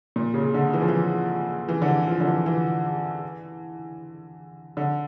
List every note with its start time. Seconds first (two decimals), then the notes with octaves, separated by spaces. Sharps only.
0.16 A#2
0.34 C#3
0.54 D3
0.73 E3
0.81 F3
0.88 E3
1.69 E3
1.82 D3
1.88 E3
2.07 F3
2.21 D3
2.27 E3
2.46 E3
4.77 D3